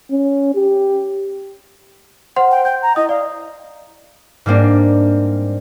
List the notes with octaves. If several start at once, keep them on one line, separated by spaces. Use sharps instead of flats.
C#4
G4
C5 F#5 C6
G5
G5 G6
A#5
E4 D#5 D#6
D5 F5
G#2 G3 A#3 C4 D4